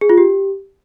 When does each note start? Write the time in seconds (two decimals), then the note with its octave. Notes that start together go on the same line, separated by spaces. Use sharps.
0.01 G#4
0.09 F4
0.18 G4